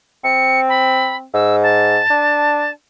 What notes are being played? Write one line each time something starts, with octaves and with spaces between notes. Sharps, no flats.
C4 C#7
B5
G#2 E6
A5
D4